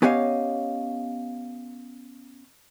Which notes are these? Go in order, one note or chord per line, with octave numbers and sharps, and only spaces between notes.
B3 C#4 G4 C#5 D#5 F5